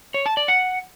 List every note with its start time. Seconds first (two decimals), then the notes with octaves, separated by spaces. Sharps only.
0.14 C#5
0.26 A5
0.37 D5
0.48 F#5